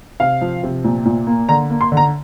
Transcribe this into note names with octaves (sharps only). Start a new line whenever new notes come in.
C3 F5
F3
C3
A#2
A#2
A#3
D3 A#5
A#3
C6
D3
A#5